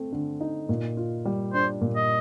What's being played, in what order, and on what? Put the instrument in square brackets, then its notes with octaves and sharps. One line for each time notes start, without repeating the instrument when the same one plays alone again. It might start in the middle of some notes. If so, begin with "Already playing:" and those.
Already playing: [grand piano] A3 C4
D3
D#4
A#2
F4
G3
[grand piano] D4 [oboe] C5
[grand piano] A#2
[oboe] D#5